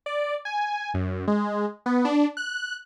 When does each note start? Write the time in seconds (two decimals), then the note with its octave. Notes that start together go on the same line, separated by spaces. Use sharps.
0.06 D5
0.45 G#5
0.94 F#2
1.28 G#3
1.86 B3
2.05 D4
2.37 F#6